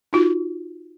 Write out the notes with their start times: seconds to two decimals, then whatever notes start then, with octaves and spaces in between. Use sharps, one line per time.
0.13 D#4 F4 F#4